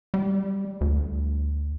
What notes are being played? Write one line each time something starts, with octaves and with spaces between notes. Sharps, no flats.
G3
D2